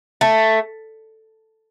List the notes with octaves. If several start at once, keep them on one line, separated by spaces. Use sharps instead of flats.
A3